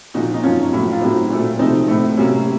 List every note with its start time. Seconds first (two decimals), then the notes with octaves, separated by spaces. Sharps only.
0.14 A#2 F3 A#3 D#4 F#4
0.34 D#4
0.43 F#2 F3 A#3 C#4 F4
0.73 A2 F#3 A#3
0.92 F4
1.01 A2 F#3 A#3 C4 D#4
1.30 A#2 F#3 A3
1.59 C3 F3 A3 C4 D#4
1.88 A2 A3
2.17 C3 F#3 A#3 C#4